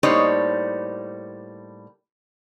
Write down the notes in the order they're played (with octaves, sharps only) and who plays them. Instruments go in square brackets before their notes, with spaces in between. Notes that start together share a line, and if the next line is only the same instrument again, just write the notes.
[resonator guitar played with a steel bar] A2 G3 A#3 D#4 C5 C#5